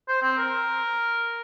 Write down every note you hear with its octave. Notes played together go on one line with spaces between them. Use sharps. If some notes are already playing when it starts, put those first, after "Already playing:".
C5
C4
A#4